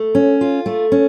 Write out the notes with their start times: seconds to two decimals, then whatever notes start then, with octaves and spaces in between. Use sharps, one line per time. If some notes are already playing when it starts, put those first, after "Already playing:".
Already playing: A3
0.15 C#4
0.41 F4
0.66 A3
0.92 C#4